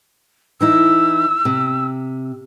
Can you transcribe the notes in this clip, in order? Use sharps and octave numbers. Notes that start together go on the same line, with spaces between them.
E3 D#4 E4 E6
C3